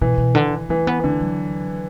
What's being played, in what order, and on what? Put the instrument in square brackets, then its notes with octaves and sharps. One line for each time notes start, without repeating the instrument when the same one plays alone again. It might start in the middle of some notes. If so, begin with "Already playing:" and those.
[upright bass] B2 [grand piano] E3
[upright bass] B2
D3
[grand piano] E3 [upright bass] A3
[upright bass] B3
[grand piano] D3 [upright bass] A3
[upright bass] F#3